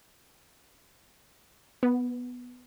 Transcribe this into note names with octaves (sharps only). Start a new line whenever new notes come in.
B3